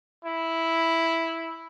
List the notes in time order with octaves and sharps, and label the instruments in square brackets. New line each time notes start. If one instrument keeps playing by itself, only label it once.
[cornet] E4